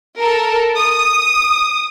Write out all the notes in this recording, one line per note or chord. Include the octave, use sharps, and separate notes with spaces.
A4 A#4
D#6